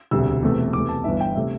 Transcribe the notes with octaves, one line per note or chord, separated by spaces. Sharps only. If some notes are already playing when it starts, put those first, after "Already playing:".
E1 D2 C3 G3 E6
E1 E2 C3 A3
E2 C3 A3 D6
A5
G1 G2 E3 E5
G5
C3 A3 E5